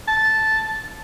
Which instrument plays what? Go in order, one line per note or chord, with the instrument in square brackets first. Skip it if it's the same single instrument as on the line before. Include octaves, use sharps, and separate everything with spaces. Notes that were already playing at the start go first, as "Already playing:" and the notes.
[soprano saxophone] A5